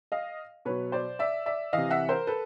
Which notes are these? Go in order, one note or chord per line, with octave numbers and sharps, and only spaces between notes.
D#5 F5
B2 F#3 B4 C#5
C5 D5
D5 E5
D5 E5
C3 E3 D#5 F5
E5 F#5
A#4 C5
A4 B4